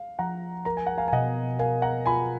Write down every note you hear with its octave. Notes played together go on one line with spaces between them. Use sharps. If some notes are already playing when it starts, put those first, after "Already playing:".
Already playing: F5
F3 F#5 A#5
A#4 A#5
G#5
F#5
F5 G#5
G#5
B2 D#5 F#5
A#4 F5 G#5
F#5 A#5
F4 G#5 B5